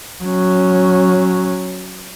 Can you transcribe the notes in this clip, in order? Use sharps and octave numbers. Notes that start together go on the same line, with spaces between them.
F#3 C#4